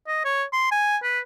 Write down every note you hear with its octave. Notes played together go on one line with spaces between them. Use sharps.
D#5
C#5
C6
G#5
B4